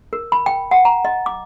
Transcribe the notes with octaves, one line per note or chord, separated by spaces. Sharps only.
A#4
B5
G5
F#5
A#5
D#5
D6